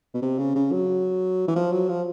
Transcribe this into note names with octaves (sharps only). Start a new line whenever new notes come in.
B2
C3
C#3
C#3
F#3
E3
F3
F#3
F3